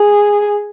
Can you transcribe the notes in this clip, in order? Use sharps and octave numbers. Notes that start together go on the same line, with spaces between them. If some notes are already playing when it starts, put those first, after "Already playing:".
Already playing: G#4